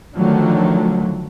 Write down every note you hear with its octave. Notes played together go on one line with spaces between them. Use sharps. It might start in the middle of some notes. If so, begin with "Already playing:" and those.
D3 D#3 F3 F#3 A3